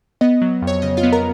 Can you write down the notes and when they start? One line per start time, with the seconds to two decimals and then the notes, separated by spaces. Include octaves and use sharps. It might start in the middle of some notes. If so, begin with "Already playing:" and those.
0.21 B3 D#5
0.42 F#3
0.62 F2
0.67 C#5
0.82 C#3 D#5
0.97 F4 F5
1.03 B3
1.12 A#4 A#5